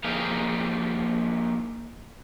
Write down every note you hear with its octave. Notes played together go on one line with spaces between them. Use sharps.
F3 A#3 D#4 G4 G#4 F5